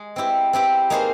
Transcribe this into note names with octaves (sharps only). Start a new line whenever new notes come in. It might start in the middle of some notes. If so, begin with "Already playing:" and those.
Already playing: G#3 G#4
C4 E4 G4
C4 E4 G4
A#3 D#4 G#4 C5